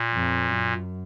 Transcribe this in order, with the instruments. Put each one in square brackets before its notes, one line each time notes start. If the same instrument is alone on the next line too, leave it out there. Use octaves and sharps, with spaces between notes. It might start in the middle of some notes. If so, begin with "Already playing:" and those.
Already playing: [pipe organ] A#2
[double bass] F2
F#2